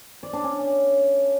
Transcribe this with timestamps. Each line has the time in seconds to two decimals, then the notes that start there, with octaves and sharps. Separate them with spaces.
0.23 D5
0.33 D4
0.44 C#4